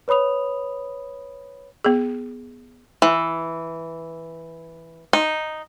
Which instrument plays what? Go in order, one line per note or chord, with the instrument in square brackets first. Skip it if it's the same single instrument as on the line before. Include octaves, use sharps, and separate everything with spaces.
[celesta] B4 C#5 B5 D#6 F7
[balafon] B3 G#4
[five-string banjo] E3
D#4